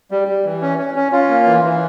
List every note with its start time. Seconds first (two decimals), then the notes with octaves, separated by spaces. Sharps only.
0.11 G3
0.28 G3
0.45 E3
0.62 C#4
0.78 C#4
0.96 C#4
1.12 C#4 F4
1.29 A#3
1.47 E3
1.64 E3